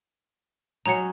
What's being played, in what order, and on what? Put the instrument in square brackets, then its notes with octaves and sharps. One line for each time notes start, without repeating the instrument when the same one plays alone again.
[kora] F#3 C#4 D#4 [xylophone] A#5 C#7